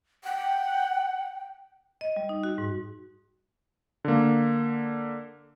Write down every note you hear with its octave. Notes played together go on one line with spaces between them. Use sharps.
F#5 G5
D#5
G3
D#4
F#4
G#2
D3 A#3